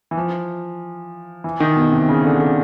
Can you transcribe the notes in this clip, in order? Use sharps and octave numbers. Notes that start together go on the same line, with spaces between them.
E3
F3
E3
D#3
B2
C3
C#3
D3
D3